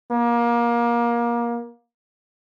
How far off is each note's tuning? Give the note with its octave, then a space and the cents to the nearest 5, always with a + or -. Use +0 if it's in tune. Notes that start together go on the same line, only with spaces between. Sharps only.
A#3 +25